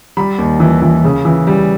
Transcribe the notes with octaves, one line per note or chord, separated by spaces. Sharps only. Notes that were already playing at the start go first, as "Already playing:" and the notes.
G3 B5
D#2
E3
E3
C#3
E3
G3